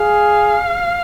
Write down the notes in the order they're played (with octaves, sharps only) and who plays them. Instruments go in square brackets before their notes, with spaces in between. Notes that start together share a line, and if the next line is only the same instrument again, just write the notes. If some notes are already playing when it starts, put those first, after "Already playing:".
Already playing: [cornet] G#4 [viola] F5